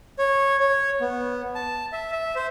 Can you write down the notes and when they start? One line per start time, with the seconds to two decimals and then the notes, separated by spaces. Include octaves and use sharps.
0.19 C#5
0.60 C#5
1.00 B3
1.55 A5
1.92 E5
2.12 E5
2.36 C5